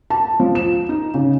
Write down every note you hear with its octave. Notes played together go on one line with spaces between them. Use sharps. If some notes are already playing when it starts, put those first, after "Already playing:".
A5
F3
E7
D#4
C#3